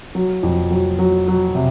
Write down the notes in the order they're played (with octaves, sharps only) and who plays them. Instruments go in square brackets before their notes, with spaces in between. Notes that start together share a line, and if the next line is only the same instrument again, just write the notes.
[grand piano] F#3
F2
F#3
F#3
F#3
C3